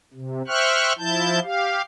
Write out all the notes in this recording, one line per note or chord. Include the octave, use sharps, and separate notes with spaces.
C3
C5 E5 G5 C#6 F6 F#6
F3 E4 A5 G6
G4 F5